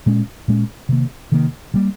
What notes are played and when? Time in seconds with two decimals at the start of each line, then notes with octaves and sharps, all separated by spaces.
0.06 A#2 G#3 C#4
0.48 A#2 G#3 C#4
0.89 C3 D#3 A#3
1.32 C3 D#3 A#3
1.74 C#3 G3 A#3